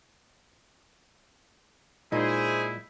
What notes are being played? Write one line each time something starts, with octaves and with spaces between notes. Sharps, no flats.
A#2 G#3 D#4 E4 G#4 C5